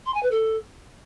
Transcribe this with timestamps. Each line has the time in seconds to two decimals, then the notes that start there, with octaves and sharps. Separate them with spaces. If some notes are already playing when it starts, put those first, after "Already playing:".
0.06 C6
0.14 G#5
0.23 B4
0.31 A4